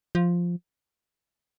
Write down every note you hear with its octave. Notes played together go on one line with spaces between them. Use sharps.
F3